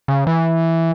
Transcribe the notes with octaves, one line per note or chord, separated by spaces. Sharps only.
C#3
E3